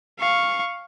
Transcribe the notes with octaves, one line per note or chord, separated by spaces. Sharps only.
F5 C#6